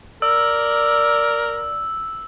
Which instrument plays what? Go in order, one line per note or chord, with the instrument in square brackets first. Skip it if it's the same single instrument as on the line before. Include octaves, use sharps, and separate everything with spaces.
[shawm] A#4 [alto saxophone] D5 [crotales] E6